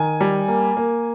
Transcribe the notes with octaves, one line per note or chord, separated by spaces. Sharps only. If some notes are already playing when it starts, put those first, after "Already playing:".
Already playing: D#3 G#5
G3
A#3
A#3